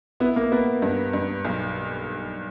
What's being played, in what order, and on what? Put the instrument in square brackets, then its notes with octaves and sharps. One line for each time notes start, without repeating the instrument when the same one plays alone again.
[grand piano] B3 [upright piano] E4
[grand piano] A#3
[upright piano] A#3 [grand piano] B3
[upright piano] G2
G2
B1